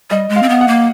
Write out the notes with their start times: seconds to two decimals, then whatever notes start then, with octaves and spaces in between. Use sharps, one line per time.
0.10 G3 D#5
0.29 G#3
0.36 F5
0.43 C4
0.49 B3
0.61 F#5
0.68 A#3